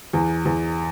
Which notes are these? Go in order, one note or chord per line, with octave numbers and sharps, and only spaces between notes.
E2
E2